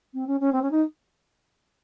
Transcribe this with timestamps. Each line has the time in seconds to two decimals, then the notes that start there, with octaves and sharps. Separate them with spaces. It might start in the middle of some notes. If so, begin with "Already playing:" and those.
0.14 C4
0.27 C#4
0.40 C#4
0.52 C4
0.62 C#4
0.71 D#4